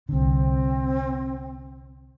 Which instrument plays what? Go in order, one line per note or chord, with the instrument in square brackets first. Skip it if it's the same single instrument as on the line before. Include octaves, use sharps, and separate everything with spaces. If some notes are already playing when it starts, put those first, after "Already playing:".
[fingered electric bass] C2 D3 [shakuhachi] C4